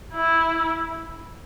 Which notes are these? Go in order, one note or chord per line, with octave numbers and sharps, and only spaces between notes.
E4